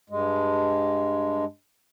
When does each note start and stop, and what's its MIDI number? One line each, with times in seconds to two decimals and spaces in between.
0.10 1.45 43
0.10 1.45 56